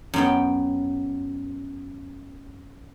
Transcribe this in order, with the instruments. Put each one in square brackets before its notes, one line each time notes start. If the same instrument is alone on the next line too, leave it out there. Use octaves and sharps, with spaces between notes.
[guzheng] F#2 B3 G5